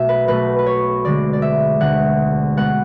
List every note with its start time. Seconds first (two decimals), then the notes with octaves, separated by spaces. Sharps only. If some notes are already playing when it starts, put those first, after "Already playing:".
Already playing: B1 B2 A3 E5
0.09 B4
0.27 B1 B2 A3 B4
0.59 B4
0.66 C#5
1.04 D2 D3 G#3 D5
1.33 D5
1.42 E5
1.80 D2 D3 G#3 F#5
2.57 B2 G#3 B3 F#5